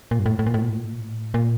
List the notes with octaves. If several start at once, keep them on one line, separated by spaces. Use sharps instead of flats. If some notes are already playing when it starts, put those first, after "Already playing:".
A#2
G2
A2
A2
A#2
A2
A#2
A2
A#2
A2
A#2
A2
A#2